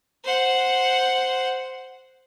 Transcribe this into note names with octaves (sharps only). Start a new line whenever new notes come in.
C5 F#5